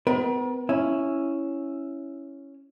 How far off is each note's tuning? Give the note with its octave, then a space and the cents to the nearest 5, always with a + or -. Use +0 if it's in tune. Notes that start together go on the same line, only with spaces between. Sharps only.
B3 +35 A#4 +45
C#4 +0 E4 +0